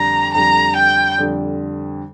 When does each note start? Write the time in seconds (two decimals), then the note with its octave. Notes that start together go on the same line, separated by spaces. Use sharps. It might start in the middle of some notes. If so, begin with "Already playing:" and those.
Already playing: F2 D3 G3 A#5
0.34 F2 D3 G3 A#5
0.77 G5
1.18 F2 D3 G3